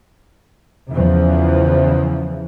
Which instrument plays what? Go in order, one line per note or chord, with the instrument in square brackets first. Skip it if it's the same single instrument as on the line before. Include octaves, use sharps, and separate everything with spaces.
[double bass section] E2 C#3 E3 F3